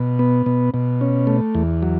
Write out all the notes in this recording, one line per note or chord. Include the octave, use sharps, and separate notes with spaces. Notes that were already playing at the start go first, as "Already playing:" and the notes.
Already playing: B2
B3
B2
B2
C#4
A3
E2
F#3